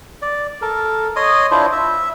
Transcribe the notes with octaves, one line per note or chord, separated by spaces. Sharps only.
D5
A4 A#4
C#5 D#5 C6 D#6
D4 E4 F4 C5
E5